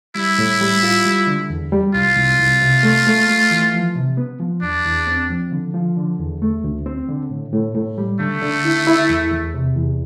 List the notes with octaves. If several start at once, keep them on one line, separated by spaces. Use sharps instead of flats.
G3 E4
A2
G3
F4
G3
D3
E2
G3
C2 F4
C2
C2
C3
A3
A3
A3
E3
F3
C3
B3
F3
E2 D4
E2
C4
F3
D3
F3
D3
E2
A3
D2
C4
D3
A2
A2
A2
G3
D3 A3
D3
E4
E4
E2
E2
C3
E2